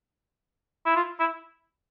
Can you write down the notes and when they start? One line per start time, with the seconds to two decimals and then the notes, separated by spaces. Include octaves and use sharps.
0.86 E4
0.96 F4
1.19 E4